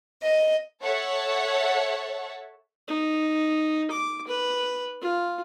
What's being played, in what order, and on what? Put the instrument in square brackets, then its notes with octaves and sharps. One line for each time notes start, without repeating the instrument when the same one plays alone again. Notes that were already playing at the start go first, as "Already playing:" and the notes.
[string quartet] D#5
[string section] A4 C#5 E5 F#5 A5
[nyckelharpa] D#4
D6
B4
F4